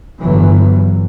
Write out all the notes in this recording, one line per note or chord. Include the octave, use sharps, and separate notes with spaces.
G1 E3 F#3